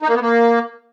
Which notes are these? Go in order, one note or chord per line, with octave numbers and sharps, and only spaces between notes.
D#4
A#3
B3
A#3